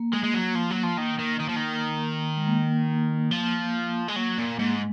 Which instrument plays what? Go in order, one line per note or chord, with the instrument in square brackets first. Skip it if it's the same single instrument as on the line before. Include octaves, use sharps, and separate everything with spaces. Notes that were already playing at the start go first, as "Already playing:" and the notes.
Already playing: [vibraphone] A#3
[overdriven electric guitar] G#3
G#3
F#3
F3
F#3
F3
D#3
D#3
D#3
F3
D#3
[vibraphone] G#3
A#3
[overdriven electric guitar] F3
G#3
[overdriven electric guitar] F#3 [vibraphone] A#3
[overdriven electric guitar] A#2
[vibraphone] A#3
[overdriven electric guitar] G#2
[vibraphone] G#3